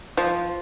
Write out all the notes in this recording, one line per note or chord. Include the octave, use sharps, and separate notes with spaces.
F3